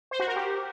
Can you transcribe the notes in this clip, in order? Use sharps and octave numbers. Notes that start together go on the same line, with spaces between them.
C5
F#4
A#4
G4